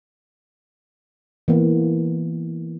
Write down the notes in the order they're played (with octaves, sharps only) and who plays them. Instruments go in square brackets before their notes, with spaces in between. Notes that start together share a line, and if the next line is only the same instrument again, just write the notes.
[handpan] E3 A#3 B3